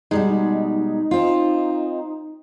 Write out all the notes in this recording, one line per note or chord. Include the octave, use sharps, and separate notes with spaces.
B2 G3 G#3 D#4
C4 F4